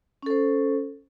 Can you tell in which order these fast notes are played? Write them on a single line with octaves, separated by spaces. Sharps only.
C#4 A4 C5